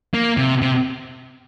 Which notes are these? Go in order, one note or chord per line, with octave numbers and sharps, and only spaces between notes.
A#3
C3
C3